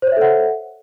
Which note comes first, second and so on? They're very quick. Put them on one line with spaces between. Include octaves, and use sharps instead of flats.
C5 C#5 E5 A4 F#5